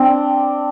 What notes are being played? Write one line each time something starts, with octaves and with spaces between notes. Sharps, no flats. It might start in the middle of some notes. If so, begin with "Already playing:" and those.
Already playing: C4 D4